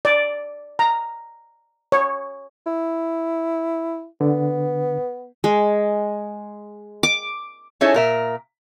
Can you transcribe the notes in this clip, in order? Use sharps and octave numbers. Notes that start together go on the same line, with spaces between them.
D5
A#5
C#5
E4
D3 B3
G#3
D6
C#4 D#4 E4 G#4 A4 C#5
A#2 A#4 E5